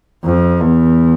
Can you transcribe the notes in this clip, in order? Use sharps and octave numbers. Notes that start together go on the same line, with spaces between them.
F2
E2